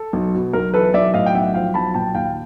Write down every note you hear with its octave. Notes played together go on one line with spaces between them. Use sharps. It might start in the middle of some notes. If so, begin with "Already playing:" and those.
Already playing: A4
B1
B2
B1 A#4
E3 A4 B4
B1 D5 E5
A2 D#5 F5
G5
B1 E5 F#5
F3 F5 G5
B1 A5 B5
A#2 G5 A5
D#2 F5 G5